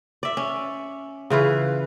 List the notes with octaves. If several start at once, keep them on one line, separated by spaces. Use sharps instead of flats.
D5 E5
C#4
C#3 E3 F4 B4